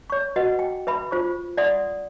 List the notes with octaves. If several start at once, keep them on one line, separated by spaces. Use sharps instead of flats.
C#5 C#6
F#4 B4 D#5 F#5
G5
B4 E5 B5
F4 C5 E5 C#6
D5 E5 F#5 C6 D#6